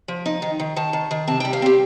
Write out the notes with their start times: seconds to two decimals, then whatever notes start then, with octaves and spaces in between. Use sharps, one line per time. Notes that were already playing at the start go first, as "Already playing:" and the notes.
0.08 F3
0.26 D#4
0.42 D#3
0.60 D#3
0.76 D#3 A5
0.93 D#3
1.11 D#3
1.28 C3 A5
1.40 G3 G5
1.53 F5
1.62 C4 G4